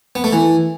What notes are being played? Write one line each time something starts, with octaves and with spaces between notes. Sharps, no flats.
B3
A3
E3